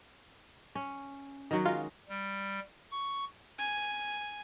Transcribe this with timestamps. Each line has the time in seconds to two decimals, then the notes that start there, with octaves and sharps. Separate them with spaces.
0.75 C#4
1.51 D#3 F#3 F#4
1.66 G#3 F4
2.09 G3
2.91 C#6
3.58 G#5